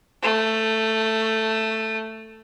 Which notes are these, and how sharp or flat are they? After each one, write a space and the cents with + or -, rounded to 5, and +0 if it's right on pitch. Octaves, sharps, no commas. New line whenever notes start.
A3 +10